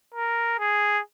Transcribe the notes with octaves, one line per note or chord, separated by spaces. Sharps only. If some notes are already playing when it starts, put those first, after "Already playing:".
A#4
G#4